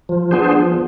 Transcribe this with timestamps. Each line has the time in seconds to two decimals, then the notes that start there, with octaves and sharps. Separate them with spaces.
0.09 F3
0.31 B3 D4 G#4 C5
0.53 F3